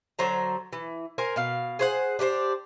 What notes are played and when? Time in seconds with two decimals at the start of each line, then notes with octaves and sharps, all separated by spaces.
0.19 D3 F#3 C5 A#5
0.73 E3
1.18 A#4 C5 G#5
1.36 B2 F5
1.79 G#4 C5 F#5
2.19 D4 G4 A#4 C5